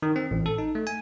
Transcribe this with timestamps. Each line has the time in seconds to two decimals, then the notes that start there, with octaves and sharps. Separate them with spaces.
0.02 D#3
0.16 C4
0.31 A1
0.46 A4
0.58 D#4
0.75 A3
0.87 G#5